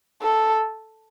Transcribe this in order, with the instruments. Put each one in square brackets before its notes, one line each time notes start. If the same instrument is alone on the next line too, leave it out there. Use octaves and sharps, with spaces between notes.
[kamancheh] A4